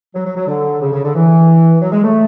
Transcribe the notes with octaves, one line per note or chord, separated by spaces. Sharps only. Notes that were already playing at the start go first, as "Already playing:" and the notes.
F#3
F#3
F#3
D3
C#3
C#3
D3
E3
F#3
G#3
A3